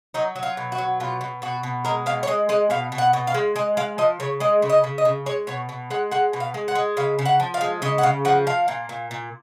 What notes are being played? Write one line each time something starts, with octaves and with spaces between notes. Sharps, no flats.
F#3 D#4
F#3
F4
B2
F#4
F#3
B2 F4
B2
B2 F#4
B2
G#3 A#4
B2 F5
C#5
G#3 D#5
G#3 D#5
B2 F5
B2
F#5
B2
F5
G#3
G#3 D#5
G#3 F5
F3 D#5
C#3 C#5
G#3 D#5
C#3
D#5
C#3
D#5
C#3
G#3 C#5
B2 C#5
B2
G#3 F#5
G#3 F#5
B2
F5
G#3
F#5
G#3
C#3 F5
C#3
F#5
F3
F5
G#3
C#3 D#5
F#5
C#3 F5
F3 F#5
F3 F5
A#2
A#2
A#2